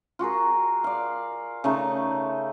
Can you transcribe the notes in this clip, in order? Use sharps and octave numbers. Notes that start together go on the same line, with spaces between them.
F4 F#4 G#4 A#4
D5 F5
C#3 A3 D#4